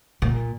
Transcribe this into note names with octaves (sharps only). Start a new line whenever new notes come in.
A#2